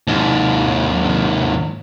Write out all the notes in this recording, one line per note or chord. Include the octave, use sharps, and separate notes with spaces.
D#2 G#2